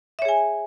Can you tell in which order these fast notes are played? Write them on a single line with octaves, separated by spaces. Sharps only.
E5 C#5 G#4 G#5